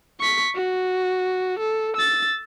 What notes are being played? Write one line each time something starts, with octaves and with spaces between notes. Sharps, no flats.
C#6 B6
F#4
A4
E6 A6